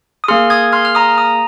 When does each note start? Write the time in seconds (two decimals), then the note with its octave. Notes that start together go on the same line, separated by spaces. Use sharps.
0.24 D#6
0.28 A#3 G#4 C6 F6
0.50 D#6 G#6
0.73 C6 F6
0.85 F6
0.95 A#5 D#6
1.18 A#5 D#6